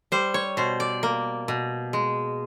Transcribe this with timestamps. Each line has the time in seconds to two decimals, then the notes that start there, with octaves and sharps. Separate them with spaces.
0.12 G3 C5
0.34 C#5
0.57 B2 C5
0.80 D5
1.03 A#3
1.48 B2
1.93 G#3